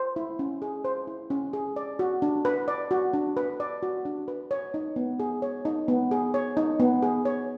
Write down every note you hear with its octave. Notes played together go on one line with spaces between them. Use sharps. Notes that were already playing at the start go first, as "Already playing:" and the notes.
Already playing: C5
E4
C#4
G#4
C5
E4
C#4
G#4
D5
F#4
D4
B4
D5
F#4
D4
B4
D5
F#4
D4
B4
C#5
D#4
B3
G#4
C#5
D#4
B3
G#4
C#5
D#4
B3
G#4
C#5